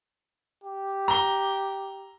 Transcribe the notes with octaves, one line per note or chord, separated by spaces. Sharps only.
G4
A#5 G7